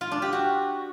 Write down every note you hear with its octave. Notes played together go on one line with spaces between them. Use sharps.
F4
D4
G4
F#4